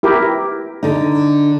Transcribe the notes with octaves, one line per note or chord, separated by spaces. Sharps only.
E4 G4 A#4
D3 D#4